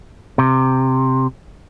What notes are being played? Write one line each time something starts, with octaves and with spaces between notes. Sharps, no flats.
C3